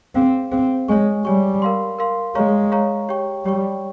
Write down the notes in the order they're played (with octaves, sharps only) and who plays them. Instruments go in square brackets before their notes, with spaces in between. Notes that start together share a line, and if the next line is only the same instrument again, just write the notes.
[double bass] C4 [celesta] G#4 C5 F5
[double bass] C4 [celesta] G#4 C5 F5
[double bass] G#3 [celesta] C#5 G#5 C#6
[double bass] G3 [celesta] C#5 G#5 C#6
[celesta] A#4 F5 C6
A#4 F5 C6
[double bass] G#3 [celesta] C#5 F5 A#5 C#6
[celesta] C#5 F5 A#5 C#6
G4 C#5 G5 C#6
[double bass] G3 [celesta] G4 C#5 G5 C#6